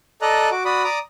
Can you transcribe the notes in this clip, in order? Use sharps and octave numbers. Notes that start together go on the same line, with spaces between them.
A4 D5 D#5 A#5 F#6
F#4 D6
F#4 D5 B5 D#6
D5 A#5 D6 D#6